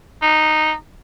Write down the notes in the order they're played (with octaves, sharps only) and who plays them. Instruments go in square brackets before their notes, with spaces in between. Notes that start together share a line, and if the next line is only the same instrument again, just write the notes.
[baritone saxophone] D#4